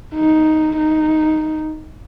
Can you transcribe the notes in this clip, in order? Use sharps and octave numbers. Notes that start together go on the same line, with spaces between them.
D#4
D#4